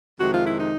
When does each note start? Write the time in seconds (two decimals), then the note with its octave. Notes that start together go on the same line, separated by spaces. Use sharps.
0.20 F2 C3 D#3 G#3 F#4
0.33 F4
0.45 E4
0.59 D#4